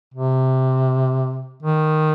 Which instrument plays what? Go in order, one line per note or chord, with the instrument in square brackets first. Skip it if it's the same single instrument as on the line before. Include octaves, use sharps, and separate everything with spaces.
[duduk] C3
D#3